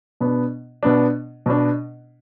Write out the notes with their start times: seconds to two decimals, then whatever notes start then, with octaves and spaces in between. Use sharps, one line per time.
0.20 B2 B3 D4
0.83 B2 B3 D4
1.46 B2 B3 D4